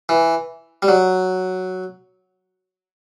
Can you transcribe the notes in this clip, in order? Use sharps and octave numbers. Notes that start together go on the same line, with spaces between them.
E3
G3
F#3